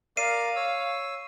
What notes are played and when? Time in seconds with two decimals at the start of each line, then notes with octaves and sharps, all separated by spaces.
0.17 A#4 D5 F5 C7 D#7
0.56 C#5 E6